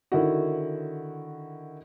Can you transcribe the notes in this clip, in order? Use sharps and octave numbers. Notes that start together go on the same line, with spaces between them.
D3 D#3 E4 F#4